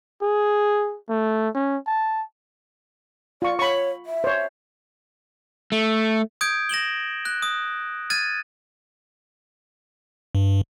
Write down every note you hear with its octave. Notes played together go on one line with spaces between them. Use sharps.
G#4
A3
C#4
A5
F4 D5 C#6
C#5 B5 C#6
E5
C5 C#5
A3
D#6 G6 G#6 D7
A#6 E7 F#7 G7
F#6
D#6
F6 G#6 A6 D#7
G2